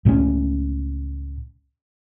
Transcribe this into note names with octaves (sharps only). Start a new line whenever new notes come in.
C#2 A2 F3 C#4